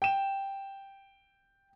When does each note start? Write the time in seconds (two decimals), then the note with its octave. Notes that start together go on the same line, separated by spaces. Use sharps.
0.02 G5 E7